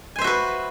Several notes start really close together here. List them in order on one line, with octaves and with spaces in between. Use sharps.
G#5 C5 E5 F#4 B4